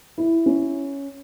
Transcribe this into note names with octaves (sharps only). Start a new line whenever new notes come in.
E4
C#4